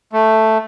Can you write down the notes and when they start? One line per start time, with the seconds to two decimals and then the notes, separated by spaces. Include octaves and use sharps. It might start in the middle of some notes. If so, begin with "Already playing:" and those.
0.13 A3